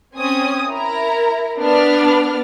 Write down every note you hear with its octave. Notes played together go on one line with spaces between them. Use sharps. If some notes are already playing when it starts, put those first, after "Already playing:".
C4 C#4 G#5 D#6
E4 A#4 A#5
B3 D4 B4 D5 F6